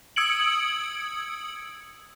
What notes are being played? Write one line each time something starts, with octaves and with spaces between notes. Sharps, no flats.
D#6 E6 G#6 C#7 D7 F#7